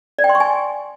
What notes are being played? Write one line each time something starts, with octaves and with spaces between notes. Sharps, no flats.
D5
G5
C6
C#6
G#5